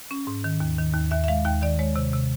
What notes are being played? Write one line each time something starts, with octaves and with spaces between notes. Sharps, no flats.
C#4
G#2
D#3
D#2
D#3
D#2
D#2 E5
E5
G#3 F5
D#2 G5
D#3 D5
G#3 C#5
C3
C3